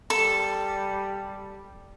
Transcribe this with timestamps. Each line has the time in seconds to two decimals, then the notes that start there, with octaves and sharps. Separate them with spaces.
0.10 G3 A4